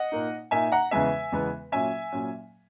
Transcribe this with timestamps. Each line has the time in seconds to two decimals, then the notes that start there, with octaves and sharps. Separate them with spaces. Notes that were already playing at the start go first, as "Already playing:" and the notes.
Already playing: D#5 F#5
0.12 A#2 A#3 D#4
0.51 A#2 A#3 D#4 E5 G#5
0.72 F#5 A#5
0.91 E2 C#3 E3 G#3 B3 E5 G#5
1.32 E2 C#3 E3 G#3 B3
1.72 A#2 F#3 C#4 E5 G#5
2.12 A#2 F#3 C#4